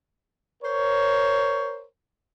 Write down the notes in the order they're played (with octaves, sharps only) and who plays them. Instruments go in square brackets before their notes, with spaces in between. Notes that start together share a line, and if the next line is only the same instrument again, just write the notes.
[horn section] A#4 C5 C#5